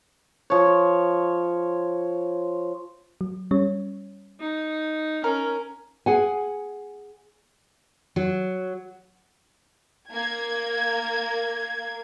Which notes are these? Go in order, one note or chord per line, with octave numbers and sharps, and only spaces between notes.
F3 C#5
F#3
G3 C#4 C#5
D#4
C#4 A#4
G#4 F#5 G#5
F#3
A#3 G#6